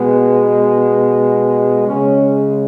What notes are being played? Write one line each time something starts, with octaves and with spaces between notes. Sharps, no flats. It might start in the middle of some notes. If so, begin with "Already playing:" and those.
Already playing: B2 G#3 B3
C#3 G#3 C#4